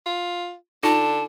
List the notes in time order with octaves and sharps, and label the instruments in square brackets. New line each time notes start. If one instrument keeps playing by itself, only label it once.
[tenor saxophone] F4
[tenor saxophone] D3 [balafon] D#4 F4 [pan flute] A5